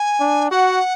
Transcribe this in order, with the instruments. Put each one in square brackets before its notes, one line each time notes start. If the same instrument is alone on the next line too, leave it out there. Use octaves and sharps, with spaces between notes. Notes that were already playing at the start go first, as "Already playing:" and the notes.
Already playing: [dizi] G#5
[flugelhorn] D4
[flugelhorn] F#4 [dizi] F#5